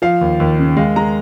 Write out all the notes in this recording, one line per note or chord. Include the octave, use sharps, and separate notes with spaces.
F3 F5
D#2
D#2
C#3
G#3 F5
G#3 A#5